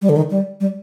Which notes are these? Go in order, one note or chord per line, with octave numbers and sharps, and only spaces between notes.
G3
D3
D#3
G3
G3